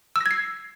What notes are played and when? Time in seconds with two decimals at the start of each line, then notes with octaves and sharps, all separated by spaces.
0.16 E6
0.21 A#6
0.26 G#6
0.31 C7